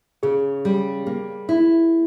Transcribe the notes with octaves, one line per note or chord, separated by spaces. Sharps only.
C#3 G#4
G3
A#3
E4